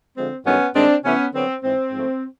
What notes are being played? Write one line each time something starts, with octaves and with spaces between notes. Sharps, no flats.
D3 F3 G#3 C4
G2 D#3 F#3 A3 B3 C#4
G2 D#3 G#3 C4 D4
C3 E3 A3 B3 C#4
D3 F#3 B3 C4
G#2 E3 G#3 C4
G#2 F3 A3